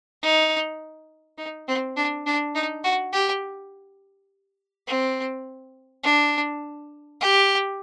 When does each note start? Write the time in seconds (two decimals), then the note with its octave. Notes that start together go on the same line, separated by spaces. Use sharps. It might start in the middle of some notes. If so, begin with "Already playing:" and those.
0.23 D#4
1.38 D#4
1.68 C4
1.97 D4
2.26 D4
2.55 D#4
2.84 F#4
3.13 G4
4.87 C4
6.04 D4
7.21 G4